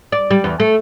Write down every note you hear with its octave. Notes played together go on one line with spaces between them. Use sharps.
D5
G3
E2
A3